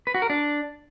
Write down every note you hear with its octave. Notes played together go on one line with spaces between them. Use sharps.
B4
F#4
A#4
D4